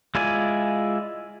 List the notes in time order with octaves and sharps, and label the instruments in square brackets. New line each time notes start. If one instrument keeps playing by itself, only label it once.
[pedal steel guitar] G#3 E4 F4 D5 G#5